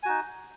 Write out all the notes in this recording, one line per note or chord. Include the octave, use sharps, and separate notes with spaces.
D#4 F#4 G#5